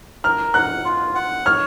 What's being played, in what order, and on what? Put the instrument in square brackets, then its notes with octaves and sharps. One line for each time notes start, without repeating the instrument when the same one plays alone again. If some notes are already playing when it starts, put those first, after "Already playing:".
[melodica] A#4 [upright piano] F6
[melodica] F#5 [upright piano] F#6
[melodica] F4
F#5
[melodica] C#5 [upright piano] F6